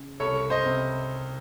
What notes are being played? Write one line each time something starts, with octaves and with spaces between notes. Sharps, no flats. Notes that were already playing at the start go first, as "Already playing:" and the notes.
Already playing: C#3
C2 A4 C#5
C5 D#5
C3